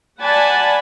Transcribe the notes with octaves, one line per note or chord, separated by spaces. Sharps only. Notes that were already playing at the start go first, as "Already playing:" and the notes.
D5 F#5 G#5 A5 B5